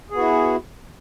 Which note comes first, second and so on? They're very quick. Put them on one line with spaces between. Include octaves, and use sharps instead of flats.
G#4 B3 F#4 E4